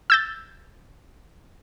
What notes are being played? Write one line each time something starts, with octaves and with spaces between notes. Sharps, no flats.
E6 G6 A6